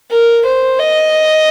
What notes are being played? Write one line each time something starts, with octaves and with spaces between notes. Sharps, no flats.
A#4
C5
D#5